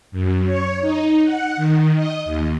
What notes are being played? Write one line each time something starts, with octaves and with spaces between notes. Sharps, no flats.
F#2
C#5
D#4
F#5
D#3
D#5
D#2